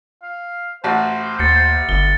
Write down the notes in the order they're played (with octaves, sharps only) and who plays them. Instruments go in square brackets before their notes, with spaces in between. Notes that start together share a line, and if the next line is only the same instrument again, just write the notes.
[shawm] F5
[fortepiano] A1 F#4 A5 [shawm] C5
[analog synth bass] D#2 [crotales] A6 C#7
[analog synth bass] G1 [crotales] G7